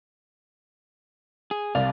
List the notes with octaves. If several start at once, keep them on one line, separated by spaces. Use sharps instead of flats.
G#4
C2 C3 D5 F5